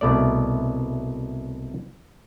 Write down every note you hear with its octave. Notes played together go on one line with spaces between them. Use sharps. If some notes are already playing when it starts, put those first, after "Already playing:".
C2 B2 A3 D5